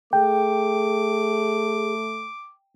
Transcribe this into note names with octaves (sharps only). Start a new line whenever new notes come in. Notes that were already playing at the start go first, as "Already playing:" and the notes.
A3 G#4 G5 D6